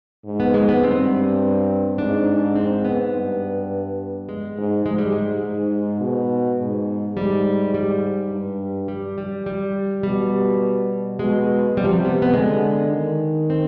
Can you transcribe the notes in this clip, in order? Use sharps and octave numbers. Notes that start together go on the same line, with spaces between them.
G#2
B3
G#3
B3
G2 C4
G#2 D4
C4
B3
G2
G#3
G#2
G#2 G#3
G3
G#3
G#2
B2
G#2
G#2 G3
G3
G2
G3
G3
G3
B2 G3
B2 G#3
C3 G3
F3
G3
B3
B3
D3 G#3
D#3
C4